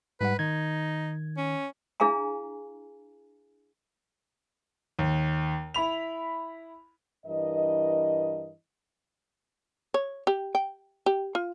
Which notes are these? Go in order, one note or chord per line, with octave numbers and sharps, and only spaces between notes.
G#2 G3 B4 F#5
D#3 D#4 G#6
C#4
D4 E4 G#4 F5 G#5 A#5
D#2
E4 B5 F7
G2 E3 A#4 D#5
C#5
G4
G5
G4
F4